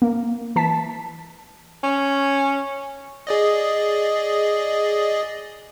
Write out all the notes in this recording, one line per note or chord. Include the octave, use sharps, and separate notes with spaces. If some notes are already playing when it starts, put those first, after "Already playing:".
A#3
E3 A5 B6
C#4
G#4 D5 D#5